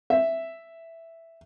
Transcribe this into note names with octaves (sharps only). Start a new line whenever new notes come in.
E5